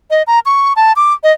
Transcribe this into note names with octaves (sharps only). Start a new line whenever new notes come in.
D#5
A#5
C#6
A5
D6
D#5